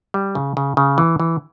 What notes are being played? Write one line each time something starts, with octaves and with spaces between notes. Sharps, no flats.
G3
C#3
C#3
C#3
E3
E3